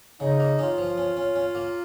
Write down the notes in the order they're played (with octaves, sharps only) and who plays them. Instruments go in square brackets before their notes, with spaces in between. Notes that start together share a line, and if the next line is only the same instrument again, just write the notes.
[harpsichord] C#3 [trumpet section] D#4
[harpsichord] A#3
[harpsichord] C#4 [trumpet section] F4
[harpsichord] F3
C#4
C#4
C#4
A#3